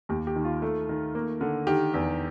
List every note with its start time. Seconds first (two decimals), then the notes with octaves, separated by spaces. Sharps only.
0.09 D#2 G4
0.27 G4
0.36 D#3
0.45 F4
0.62 A3
0.89 D#3
1.15 A#3
1.41 D3
1.67 D#3 G4
1.94 E2